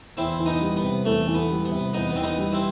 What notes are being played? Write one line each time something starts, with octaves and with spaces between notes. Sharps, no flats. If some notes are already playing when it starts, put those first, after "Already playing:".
E2 C4 E4
E3
B3 D#4
G3
B3
C3
E2 A3
E3
B3
G3
B3
C3
E2 B3 D#4
B3
E3 C4
B3 D#4
G3
C4 E4